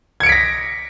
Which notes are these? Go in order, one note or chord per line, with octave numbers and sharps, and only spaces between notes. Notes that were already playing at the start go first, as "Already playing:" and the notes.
G#6 A#6 B6 C#7 D7